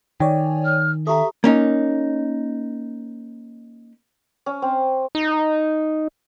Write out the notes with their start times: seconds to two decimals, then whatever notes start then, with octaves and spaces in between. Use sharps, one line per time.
0.20 D#3 C#5 D5 G5 G#5
0.65 F6
1.07 G4 A4 E5 A#5 C#6 D#6
1.44 A#3 C#4 D#4
4.46 C#4
4.62 C4
5.15 D#4